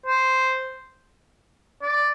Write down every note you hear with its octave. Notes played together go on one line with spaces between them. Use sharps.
C5
D5